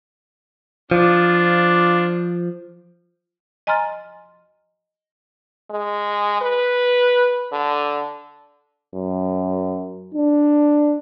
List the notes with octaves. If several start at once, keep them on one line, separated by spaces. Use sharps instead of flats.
F3 D4 F4
D#5 G#5 A#5 C6 F6 A6
G#3
B4
D3
F#2
D4